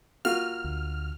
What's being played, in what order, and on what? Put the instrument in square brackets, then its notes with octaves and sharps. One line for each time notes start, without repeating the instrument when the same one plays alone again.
[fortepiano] A#3 F4 F#4 [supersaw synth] F6
[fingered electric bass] D2